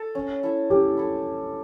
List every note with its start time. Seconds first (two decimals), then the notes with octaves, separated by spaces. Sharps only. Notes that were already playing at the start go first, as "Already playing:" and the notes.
Already playing: A4
0.15 C#4
0.43 E4 A4 E5
0.70 C#4 G4
0.97 E4 A4 E5